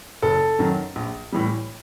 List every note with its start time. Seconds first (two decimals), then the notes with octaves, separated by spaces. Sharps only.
0.22 F#1 A4
0.59 F#2 D#3 F#3
0.96 A#1
1.32 A2 E3 G3